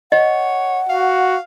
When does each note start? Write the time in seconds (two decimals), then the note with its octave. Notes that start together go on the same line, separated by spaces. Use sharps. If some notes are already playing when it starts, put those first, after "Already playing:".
0.12 C#5 D#5 F#5
0.89 F#4 F5